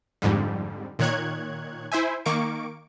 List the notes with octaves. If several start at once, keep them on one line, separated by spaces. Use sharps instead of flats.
F2 G#2 D3 G3
A#2 D#3 C#5 F#6 G#6
E4 C5 E5 G#5
D#3 A#3 C#6 D6 D7